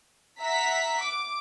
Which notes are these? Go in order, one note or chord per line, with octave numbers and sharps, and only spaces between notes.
E5 F#5 A#5 B6
D6